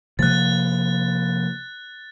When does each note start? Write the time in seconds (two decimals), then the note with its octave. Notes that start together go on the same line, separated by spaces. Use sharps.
0.19 C3 F3 A#3 F#6 A6